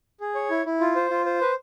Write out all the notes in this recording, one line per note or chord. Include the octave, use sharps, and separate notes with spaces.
G#4
C#5
E4
E4
F4
C5
F4
C5
B4